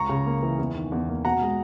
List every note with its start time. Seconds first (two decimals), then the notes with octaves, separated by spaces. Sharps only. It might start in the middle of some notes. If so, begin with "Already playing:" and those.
Already playing: C#2 A#5 C#6
0.09 C#3
0.26 A#3
0.43 E3
0.59 E2
0.75 D#3
0.92 E2
1.09 A#3
1.25 B2 F#5 A#5
1.42 G#3